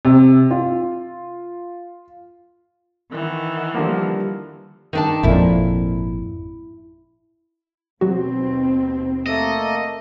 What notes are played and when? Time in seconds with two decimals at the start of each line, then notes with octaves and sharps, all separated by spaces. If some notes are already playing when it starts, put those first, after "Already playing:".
0.05 C3
0.51 F4
3.11 D#3 E3 B3
3.75 D3 F3 G3 A#3
4.93 D#3 D4 A5
5.23 G#1 F2 A#2 E4
8.01 D#2 B2 F#3 C4 F#4
9.26 A3 A#3 A4 D#5